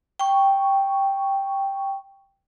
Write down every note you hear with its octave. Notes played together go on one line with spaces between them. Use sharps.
G5 C#6